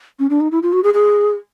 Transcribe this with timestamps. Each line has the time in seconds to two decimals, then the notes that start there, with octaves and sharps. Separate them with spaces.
0.19 C#4
0.30 D4
0.40 D#4
0.51 E4
0.62 F4
0.73 F#4
0.83 G#4
0.94 G#4